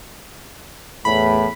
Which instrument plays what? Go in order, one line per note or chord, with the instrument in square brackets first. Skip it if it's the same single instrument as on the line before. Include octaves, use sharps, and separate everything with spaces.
[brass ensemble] E2 A2 [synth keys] B5